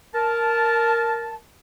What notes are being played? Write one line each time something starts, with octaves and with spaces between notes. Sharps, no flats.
A#4 A5